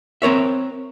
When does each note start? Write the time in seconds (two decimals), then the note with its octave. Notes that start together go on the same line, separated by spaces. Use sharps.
0.22 C4 A#4 C#5 E5